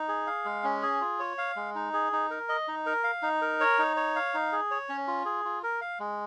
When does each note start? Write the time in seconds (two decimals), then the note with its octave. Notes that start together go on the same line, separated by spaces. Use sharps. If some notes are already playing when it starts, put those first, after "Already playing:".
Already playing: D#4
0.08 G#4
0.27 F5
0.45 G#3
0.64 C#4
0.82 G#4
1.01 F4
1.20 C#5
1.38 F5
1.56 G#3
1.75 D#4
1.93 G#4
2.13 D#4
2.31 A#4
2.49 D#5
2.68 D#4
2.86 A#4
3.04 F5
3.23 D#4
3.42 A#4
3.60 C#5
3.79 D#4
3.96 C#5
4.16 F5
4.34 D#4
4.52 G#4
4.71 C#5
4.89 C#4
5.08 F4
5.26 G#4
5.45 F4
5.63 A#4
5.81 F5
6.00 G#3